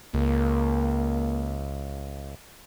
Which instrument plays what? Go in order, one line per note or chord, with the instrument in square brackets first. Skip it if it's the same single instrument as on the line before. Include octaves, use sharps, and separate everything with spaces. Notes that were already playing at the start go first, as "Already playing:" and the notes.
[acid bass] C#2 [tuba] A#3